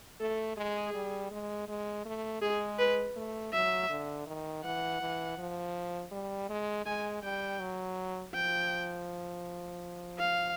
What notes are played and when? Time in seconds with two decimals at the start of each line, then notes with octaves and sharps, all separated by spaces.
0.20 A3 A4
0.57 G#3 G#4
0.94 G3
1.31 G#3
1.68 G#3
2.05 A3
2.42 G#3 G#4
2.79 B4
3.16 A3
3.53 F#3 E5
3.90 D3
4.27 D#3
4.64 E3 F#5
5.01 E3
5.38 F3
6.12 G3
6.49 G#3
6.86 G#3 G#5
7.23 G3 G5
7.60 F#3
8.34 F3 G5
10.18 F5